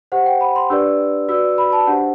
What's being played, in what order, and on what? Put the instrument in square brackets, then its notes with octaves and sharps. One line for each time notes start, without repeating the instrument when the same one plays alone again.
[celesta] G4 C5 F#5
G5
B5
C6
D4 G4 B4 D5 E6
F#4 B4 D5 E6
B5
A5
D4 G4 C5 F#5